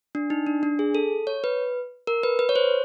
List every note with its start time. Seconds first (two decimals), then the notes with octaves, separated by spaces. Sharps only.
0.15 D4
0.30 D#4
0.47 D4
0.63 D4
0.79 G#4
0.95 A4
1.27 C#5
1.44 B4
2.07 A#4
2.23 B4
2.39 B4
2.49 C#5
2.56 C5